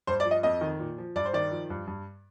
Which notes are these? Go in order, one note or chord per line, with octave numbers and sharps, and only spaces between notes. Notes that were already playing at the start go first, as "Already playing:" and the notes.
G2 C5
D5
F3
D#5
F2 D#5
D#3
A#2
F3
G2 D5
C5
D#3 D5
F3
G2
G2